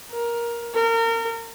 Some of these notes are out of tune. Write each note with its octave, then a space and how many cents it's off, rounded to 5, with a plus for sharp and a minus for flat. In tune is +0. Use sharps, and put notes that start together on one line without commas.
A#4 +15
A#4 -30